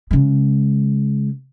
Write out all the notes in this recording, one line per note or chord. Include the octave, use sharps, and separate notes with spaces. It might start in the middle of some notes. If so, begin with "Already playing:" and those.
C#3 G#3